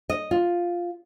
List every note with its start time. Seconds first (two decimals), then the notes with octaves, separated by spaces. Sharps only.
0.10 D#5
0.31 F4